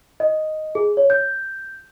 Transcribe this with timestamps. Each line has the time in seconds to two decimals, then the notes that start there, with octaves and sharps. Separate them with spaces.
0.20 D#5
0.75 G#4
0.97 C#5
1.10 G6